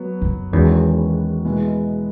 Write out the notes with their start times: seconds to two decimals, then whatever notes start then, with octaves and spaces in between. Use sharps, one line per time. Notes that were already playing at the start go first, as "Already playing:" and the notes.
Already playing: F#3 B3 F#4
0.22 F#2
0.52 E2 D#3 G#3 C#4 F#4
1.45 B2 G#3 B3 E4